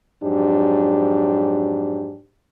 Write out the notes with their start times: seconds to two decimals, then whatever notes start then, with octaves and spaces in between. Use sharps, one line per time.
0.23 F2 G#2 F#3 D4 G4